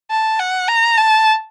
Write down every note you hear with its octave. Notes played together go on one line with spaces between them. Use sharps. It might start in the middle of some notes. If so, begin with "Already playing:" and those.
A5
F#5
A#5
A5